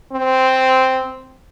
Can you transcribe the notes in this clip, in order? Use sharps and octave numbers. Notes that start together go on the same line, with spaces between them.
C4